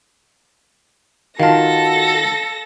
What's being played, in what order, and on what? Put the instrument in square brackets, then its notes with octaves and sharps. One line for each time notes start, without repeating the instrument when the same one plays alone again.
[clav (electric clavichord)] D#3 F4 [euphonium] F#4 [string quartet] A4 A#6 [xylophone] F5 A5